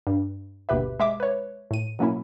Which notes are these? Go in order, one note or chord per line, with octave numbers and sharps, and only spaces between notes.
G2
G1 D#2 B2 G4 B4 E5
G#3 E5 D6
B4 C#5
A2 D#7
B2 F#3 A#3 C#4 E4